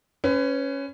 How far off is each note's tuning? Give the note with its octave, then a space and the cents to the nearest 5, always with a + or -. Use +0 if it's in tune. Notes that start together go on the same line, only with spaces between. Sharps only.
C#4 +0 B4 +30